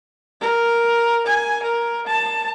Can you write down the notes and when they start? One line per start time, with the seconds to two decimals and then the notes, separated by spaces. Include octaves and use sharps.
0.41 A#4
1.26 G#5
1.63 A#4
2.06 A5